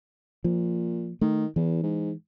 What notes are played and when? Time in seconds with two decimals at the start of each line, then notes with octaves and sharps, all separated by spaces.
0.44 A#2 F3
1.21 D#3 A3
1.56 E2 E3
1.83 G#2